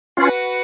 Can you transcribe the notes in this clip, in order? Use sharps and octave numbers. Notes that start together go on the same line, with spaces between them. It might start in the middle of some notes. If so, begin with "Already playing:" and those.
C#4 F4 F#4 B4 F#5